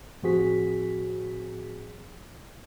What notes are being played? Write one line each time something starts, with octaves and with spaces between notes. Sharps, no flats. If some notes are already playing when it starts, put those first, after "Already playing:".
A2 F3 C4 F#4 G#4 B6